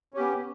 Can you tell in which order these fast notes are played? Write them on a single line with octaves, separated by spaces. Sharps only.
C#4 G4 B3